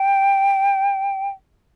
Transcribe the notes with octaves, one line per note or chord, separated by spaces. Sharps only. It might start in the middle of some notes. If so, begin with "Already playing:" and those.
Already playing: G5